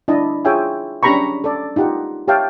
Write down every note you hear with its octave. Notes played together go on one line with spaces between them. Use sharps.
D4 E4 D#5 A5
F4 G#4 C#5 E5 G5 G#5
C#4 D4 G4 A#5 B5 C#6
A4 D5
D#4 F4 G4 F#5
G4 C#5 E5 F5 G5 A5